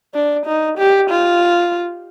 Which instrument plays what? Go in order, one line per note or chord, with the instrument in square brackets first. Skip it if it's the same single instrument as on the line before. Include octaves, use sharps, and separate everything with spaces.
[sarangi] D4
D#4
G4
F4